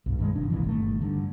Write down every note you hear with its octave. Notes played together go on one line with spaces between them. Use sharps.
B1 G2
G2 D#3 G#3
G1 C3 D4
A#1 A#2 D#3 E3
G1 D#3 A3
G2 D3